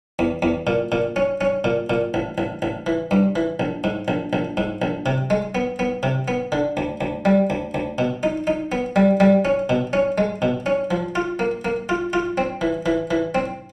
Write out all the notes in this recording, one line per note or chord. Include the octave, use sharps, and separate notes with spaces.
E2
E2
A#2
A#2
C#4
C#4
A#2
A#2
A1
A1
A1
E3
G2
E3
A#1
G#2
A#1
A#1
G#2
A#1
C3
G#3
B3
B3
C3
B3
D3
D2
D2
G3
D2
D2
B2
D#4
D#4
B3
G3
G3
C#4
B2
C#4
G#3
B2
C#4
F3
F4
A#3
A#3
F4
F4
C4
E3
E3
E3
C4